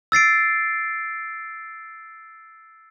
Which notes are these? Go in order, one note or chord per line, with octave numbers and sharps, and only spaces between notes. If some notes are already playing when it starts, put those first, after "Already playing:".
E6 A6 C7 D7